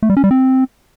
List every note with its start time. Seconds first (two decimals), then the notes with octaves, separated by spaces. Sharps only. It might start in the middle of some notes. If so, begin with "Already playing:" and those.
0.03 A3
0.10 G3
0.17 C#4
0.24 G3
0.31 C4